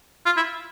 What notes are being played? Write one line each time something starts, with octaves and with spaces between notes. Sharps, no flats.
F4
E4